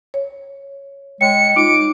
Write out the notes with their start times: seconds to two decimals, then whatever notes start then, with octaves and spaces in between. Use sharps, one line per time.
0.14 C#5
1.21 G#3 C#5 G5 C#7
1.56 D#4 F4 D6 D7